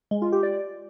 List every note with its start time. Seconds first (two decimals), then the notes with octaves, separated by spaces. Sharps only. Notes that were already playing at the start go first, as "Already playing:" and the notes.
0.11 G#3
0.22 F4
0.32 G4
0.43 D5